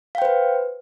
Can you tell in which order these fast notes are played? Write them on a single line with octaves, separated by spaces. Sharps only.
F5 G5 C5 B4